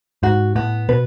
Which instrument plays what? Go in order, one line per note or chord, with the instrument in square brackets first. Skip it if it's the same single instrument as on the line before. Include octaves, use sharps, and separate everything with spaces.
[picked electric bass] G#2 [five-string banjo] F#4
[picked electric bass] A2 [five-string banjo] B3
[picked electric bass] B2 [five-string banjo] B4